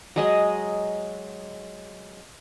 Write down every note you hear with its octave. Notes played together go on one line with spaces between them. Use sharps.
F#3 G#3 D#5